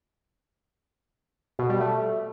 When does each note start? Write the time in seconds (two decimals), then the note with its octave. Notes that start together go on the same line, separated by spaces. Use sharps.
1.59 B2
1.69 G3
1.80 A3